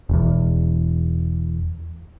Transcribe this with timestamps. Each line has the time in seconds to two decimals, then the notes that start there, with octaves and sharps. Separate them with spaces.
0.09 E1 E2